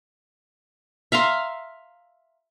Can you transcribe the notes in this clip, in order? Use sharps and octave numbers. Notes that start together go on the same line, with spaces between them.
E5 F5 A#5 C6